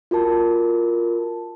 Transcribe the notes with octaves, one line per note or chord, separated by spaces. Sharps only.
F4 F#4 A#4 A5